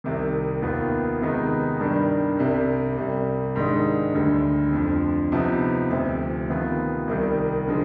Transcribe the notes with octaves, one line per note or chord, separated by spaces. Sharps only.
C2 C3 D#3
D#2 D#3 B3 F4
C3 D#3 G#3 B3 D#4
G2 D#3 G3 D4
C2 C3 G3
C2 C3 G3
G#2 D#3 G#3 D4
D2 D3 G3 D4
F2 D3 F3
C3 F3 B3 D#4
D2 C3 F3
C3 D#3 B3 F4
C2 C3 D#3 G3
D3 F3 G#3